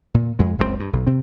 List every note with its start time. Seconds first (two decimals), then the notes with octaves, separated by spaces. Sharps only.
0.14 A#2
0.39 F2 G#3
0.58 F#1 C#2 B2 C4
0.80 G2
0.93 B1
1.07 C3 C4